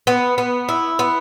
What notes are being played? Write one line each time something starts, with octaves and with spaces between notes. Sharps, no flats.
B3
B3
E4
B3